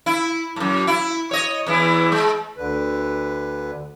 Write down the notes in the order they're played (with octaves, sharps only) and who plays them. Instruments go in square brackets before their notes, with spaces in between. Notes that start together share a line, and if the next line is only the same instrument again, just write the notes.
[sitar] E4
F#2 A2
E4
C#5 D#5
E2 E3 E4
G#3
[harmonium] D2 D3 B4